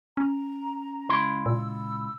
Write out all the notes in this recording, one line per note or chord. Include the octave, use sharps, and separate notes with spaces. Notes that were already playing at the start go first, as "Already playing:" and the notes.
C#4 A#5
C#2 E4 C6
A#2 E6